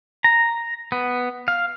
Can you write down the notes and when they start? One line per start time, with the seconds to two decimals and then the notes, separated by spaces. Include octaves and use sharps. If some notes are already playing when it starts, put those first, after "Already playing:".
0.24 A#5
0.92 B3
1.48 F5